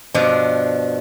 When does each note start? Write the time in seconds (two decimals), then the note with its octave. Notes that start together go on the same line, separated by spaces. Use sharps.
0.14 G2 B2 F3 D4